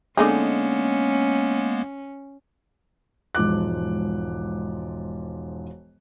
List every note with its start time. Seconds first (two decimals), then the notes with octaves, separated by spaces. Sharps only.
0.17 D3 G#3 A#3 B3 C#4 D#4 G#4
3.35 E1 G#2 F3 D6 F#6